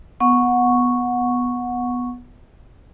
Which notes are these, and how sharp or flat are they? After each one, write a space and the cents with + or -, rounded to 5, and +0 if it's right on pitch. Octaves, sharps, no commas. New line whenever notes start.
B3 +0 F#5 -20 C#6 +0